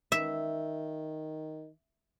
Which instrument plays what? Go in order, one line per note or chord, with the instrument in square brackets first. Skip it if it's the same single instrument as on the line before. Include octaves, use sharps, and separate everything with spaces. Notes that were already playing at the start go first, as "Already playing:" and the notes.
[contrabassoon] D#3 [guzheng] E5